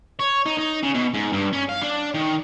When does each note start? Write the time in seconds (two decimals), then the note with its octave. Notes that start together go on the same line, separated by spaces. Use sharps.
0.19 C#5
0.46 D#4
0.59 D#4
0.83 C#3
0.95 B2
1.14 G#2
1.33 G2
1.53 C#4
1.69 F5
1.82 D4
2.14 D#3